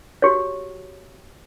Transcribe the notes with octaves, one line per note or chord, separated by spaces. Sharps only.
F#4 G4 C#5